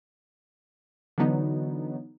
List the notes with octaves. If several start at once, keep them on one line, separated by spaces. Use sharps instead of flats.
D3 E3 F#3 B3 D#4